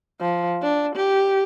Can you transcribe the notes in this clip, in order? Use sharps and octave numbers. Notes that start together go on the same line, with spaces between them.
F3
D4
G4